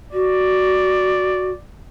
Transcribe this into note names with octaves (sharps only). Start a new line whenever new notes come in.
F#4 D5